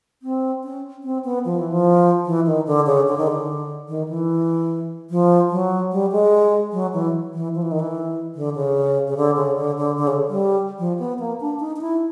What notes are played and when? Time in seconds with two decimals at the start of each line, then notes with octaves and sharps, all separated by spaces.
0.22 C4
0.64 C#4
1.04 C4
1.25 B3
1.45 F3
1.59 E3
1.72 F3
2.26 E3
2.46 D#3
2.67 D3
2.86 C#3
3.07 D3
3.17 D#3
3.27 D3
3.88 D#3
4.08 E3
5.10 F3
5.51 F#3
5.92 G3
6.12 G#3
6.72 F#3
6.93 E3
7.34 E3
7.55 F3
7.62 E3
7.72 D#3
7.79 E3
8.35 D3
8.55 C#3
9.07 C#3
9.17 D3
9.36 C#3
9.57 D3
9.78 D3
9.97 D3
10.07 C#3
10.28 G3
10.79 F3
10.99 B3
11.19 A#3
11.40 D4
11.60 D#4
11.76 D#4
11.81 E4